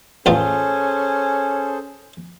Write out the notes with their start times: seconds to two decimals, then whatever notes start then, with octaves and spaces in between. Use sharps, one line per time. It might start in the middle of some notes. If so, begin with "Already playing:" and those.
0.26 A1 E2 C#4 F4 G#4 A4 C5